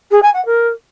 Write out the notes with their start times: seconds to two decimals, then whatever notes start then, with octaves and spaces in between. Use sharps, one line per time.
0.11 G#4
0.22 G#5
0.34 F#5
0.45 A#4